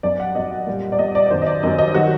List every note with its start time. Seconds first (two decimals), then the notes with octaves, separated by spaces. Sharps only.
0.03 F#2 F#3 D5
0.20 F#5
0.35 F#2 F#3 D#5
0.51 F#5
0.67 A#2 G3
0.92 D5
0.99 A#2 G3 D#5
1.15 D5
1.26 D5
1.30 F#2 D#3 F#3 C5
1.42 D#5
1.47 D5
1.63 F#2 D#3 F#3 D#5
1.79 D#5
1.94 D#3 F#3 F#4